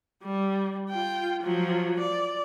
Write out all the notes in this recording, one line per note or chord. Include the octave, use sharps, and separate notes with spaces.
G3
F4 G5
F3 F#3
D5